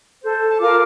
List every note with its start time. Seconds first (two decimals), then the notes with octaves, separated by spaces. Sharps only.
0.22 A4 C5
0.49 A5
0.61 F4 A#4 F5 D6